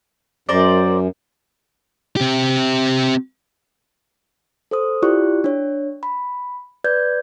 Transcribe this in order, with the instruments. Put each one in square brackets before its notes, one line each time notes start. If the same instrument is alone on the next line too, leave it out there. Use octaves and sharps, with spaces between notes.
[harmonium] F#2 [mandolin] A#4 C5 D5
[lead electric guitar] C4 G4
[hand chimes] A4 C5 D#6
E4 F4 G4 D5 C#6 F#6
D4 C#5
B5
B4 D5 G6 G#6